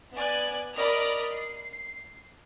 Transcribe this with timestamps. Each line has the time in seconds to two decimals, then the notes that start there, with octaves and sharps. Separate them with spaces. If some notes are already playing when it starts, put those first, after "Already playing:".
0.14 B3 D5 G#5 F#6
0.76 A#4 D5 D#5 B5 D#6 F6
1.32 C7